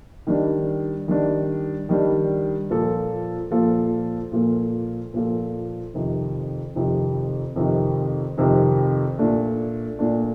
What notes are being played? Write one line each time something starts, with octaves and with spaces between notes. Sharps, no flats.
D#3 G3 D4
D#3 G3 D4
D#3 G3 D4
A#2 F3 A#3 F4 A4
A#2 F3 A#3 F4 A4
A#2 F3 A#3 F4 A4
A#2 F3 A#3 F4 A4
F2 C3 D#3
F2 C3 D#3
F2 C3 D#3
F2 C3 D#3
A#2 A3 D4
A#2 A3 D4